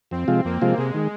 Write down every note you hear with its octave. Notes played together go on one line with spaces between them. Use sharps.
F2 C4
C3 F3 G#3 F4
F2 A#3
C3 F3 G#3 F4
C3 G#3
D#3 G#3